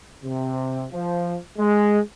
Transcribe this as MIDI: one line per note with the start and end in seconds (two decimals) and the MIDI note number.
0.24 0.86 48
0.93 1.38 53
1.58 1.99 56